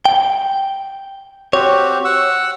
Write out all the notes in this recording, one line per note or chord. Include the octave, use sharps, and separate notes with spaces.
G5
C4 F#4 G4 C#5
F#5 E6